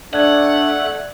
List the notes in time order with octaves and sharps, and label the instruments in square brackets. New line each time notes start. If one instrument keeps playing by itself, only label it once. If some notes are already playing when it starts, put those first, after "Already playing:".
[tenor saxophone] A3 [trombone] D4 [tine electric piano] D5 F#6 G#6 [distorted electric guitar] F#5